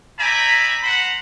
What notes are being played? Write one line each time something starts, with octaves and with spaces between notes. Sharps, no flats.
D5 E5 G5 G#5 A#5 B5
C5 F#5 A#5 B5